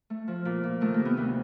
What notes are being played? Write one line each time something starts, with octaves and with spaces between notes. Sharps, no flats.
A3
F3
A#2
A#2
D#3 A3
A#3
C3
B3
D2 B3